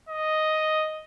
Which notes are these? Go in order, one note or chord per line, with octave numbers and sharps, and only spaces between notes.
D#5